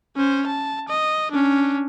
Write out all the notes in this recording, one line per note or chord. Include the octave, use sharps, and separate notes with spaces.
C#4 C5
A5
D#5
C#4 D4